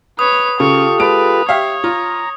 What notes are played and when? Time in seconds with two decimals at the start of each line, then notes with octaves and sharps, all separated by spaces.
0.19 B4 C#5 D#6
0.60 C#3 F4 G4 A4 C#6
0.99 G#3 B4 A5 D7
1.49 G4 C#5 E5 F5
1.84 F4 A#5